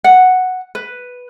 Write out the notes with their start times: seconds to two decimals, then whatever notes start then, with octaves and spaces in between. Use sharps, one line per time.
0.04 F#5
0.75 B4